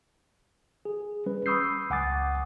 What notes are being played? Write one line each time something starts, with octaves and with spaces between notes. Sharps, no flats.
G#4
G3 C#4 B4
B5 C#6 D#6 E6 G6 C7
C#2 F#5 G#5 D6 D#6 A6